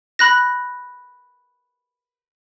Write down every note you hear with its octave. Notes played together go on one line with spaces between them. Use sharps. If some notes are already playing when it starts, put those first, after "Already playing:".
B5 F#6 A#6